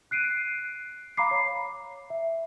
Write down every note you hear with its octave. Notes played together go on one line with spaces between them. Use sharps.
F#6 C7 D7 D#7
F5 A#5 B5 D6 C7
C#5
E5